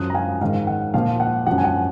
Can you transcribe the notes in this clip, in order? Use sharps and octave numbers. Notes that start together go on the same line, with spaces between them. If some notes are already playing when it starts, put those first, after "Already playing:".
Already playing: F#2 F3 D#6 F#6
A#5
F5 G#5
G#2 D#3 F5
F#5
A#2 F3 F5
F#5
F#2 F3 F#5
G#5
F#5